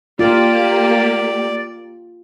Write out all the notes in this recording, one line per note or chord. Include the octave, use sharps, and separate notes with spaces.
A#3 F4 G4 D5